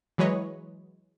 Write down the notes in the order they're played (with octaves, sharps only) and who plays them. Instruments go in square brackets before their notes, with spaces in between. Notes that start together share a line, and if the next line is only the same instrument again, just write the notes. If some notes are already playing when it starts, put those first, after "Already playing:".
[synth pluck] E3 F#3 G#3 B4 C#5 D#5